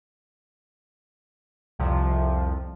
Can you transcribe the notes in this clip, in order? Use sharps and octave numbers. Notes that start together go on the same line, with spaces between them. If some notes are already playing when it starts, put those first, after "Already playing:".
C2 F2 C3 F3